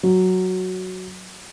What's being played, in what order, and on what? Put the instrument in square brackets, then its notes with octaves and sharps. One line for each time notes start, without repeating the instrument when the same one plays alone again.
[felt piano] F#3